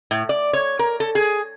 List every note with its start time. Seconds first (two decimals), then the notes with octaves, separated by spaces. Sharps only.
0.11 A2
0.29 D5
0.53 C#5
0.79 A#4
1.00 A4
1.15 G#4